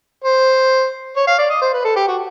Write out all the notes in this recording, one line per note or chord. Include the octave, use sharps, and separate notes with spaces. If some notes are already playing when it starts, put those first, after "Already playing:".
C5
C#5
F5
D5
D#5
C5
B4
A4
G4
F#4